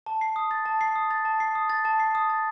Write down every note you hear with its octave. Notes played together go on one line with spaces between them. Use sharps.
A5
C7
D#6
A6
A5
C7
D#6
A6
A5
C7
D#6
A6
A5
C7
D#6
A6